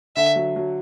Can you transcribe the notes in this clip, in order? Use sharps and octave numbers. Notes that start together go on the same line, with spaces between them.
D3 E5
F#3
F#3